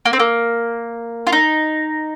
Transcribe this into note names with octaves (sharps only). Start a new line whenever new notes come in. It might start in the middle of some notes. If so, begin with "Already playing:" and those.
A#3
C4
A#3
F4
D#4